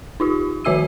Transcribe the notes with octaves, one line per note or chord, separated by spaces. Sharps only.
D#4 F4 G4
D#3 F3 F#4 E5 E6 D#7